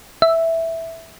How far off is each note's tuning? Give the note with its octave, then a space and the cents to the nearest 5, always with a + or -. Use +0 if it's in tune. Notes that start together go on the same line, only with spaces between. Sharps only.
E5 -5